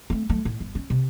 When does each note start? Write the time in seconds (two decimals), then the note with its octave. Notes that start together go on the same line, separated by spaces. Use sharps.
0.10 A3 C4
0.29 F#3 A3
0.45 A2
0.60 G1
0.75 C#4
0.90 C3